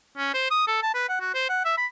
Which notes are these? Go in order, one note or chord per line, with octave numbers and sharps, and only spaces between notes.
C#4
C5
D#6
A4
A5
B4
F#5
F#4
C5
F#5
E5
B5